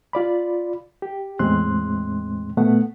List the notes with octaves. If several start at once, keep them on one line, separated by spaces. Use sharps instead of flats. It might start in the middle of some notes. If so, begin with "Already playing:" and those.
F4 D5 B5
G4
E2 A2 G#3 C4 C6 F#6
A#2 A3 B3 F#5